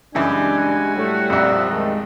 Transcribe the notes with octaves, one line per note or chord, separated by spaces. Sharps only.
F#2 C#3 E3 G3 G#3 D4 G4 G#5
F#4
A2 G3 A3
A#1 F2 F3 D5 E5
D#3 G#3 A3